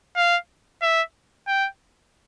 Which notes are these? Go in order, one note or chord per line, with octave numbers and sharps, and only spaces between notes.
F5
E5
G5